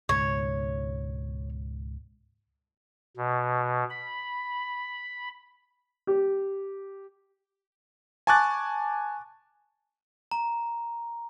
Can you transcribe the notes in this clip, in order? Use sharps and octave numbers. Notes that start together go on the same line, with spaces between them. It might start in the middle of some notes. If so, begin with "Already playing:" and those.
C#2 G#2 B2 C#5
B2
B5
G4
G#5 A5 C#6 D6 F#6 A6
A#5